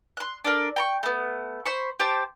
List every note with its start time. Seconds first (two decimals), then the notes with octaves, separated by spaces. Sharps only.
0.17 C6 F#6
0.44 D4 A4 A#4
0.76 G5 A#5 C#6
1.03 A3 B3
1.66 C5 B5 C#6
2.00 G4 C5 G5 A5